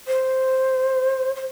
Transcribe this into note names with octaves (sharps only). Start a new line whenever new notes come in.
C5
C5